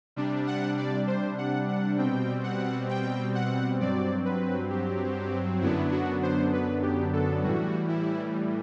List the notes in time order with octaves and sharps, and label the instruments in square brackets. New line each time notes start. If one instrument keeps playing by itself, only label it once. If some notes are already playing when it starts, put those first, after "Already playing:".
[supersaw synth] C3 G3 D4
F#5
D5
C5
F#5
F#5
B2 G3 C4 G5
F#5
G5
F#5
G2 F#3 C4 D5
B4
G4
F#2 D3 F#3 B3 D4 E4
F#4
C5
B4
G4
A4
A2 E3 G3 F#4
E4